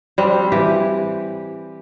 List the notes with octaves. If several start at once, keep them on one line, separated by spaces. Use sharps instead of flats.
G3 C4 D4
E3 G4